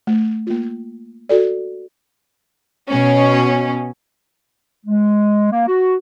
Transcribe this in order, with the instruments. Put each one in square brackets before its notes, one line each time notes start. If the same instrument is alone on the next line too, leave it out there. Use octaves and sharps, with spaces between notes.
[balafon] A3
A#3 F4
F#4 A4 D5
[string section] B2 C#4
[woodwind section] G#3
A#3
F#4